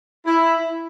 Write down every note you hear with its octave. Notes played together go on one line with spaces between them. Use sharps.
E4